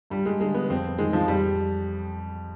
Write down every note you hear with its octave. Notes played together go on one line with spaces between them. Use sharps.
G2 G3
G#3
D3 G#3
B3
F2 C4
D#3 G#3
F3
F2 G3